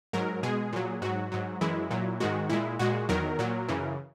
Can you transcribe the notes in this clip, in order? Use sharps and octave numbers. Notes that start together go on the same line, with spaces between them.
G#2 F#3 A#4
B2 G#3 G#4
A#2 F#3
G#2 F#3 F#4
G#2 F#3
F#2 E3 G#3 E4
A#2 F#3
G#2 D#3 G#3 F#4
A#2 G#3 E4
A#2 G#3 F#4
E2 D#3 F#3 A#4
A#2 F#3
F#2 C#3 E3